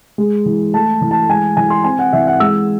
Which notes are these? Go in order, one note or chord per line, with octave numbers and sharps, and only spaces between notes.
G#3
E3
A3 A5
E3
A5
G#3 G#5
E3 G#5
C6
C4 G#5
F#5
E3 E5
F#5
G#3 E6